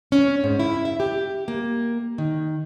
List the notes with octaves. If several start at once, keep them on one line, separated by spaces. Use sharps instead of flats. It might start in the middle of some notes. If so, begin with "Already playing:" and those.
C#4
G#2
E4
E5
G4
A#3
D#3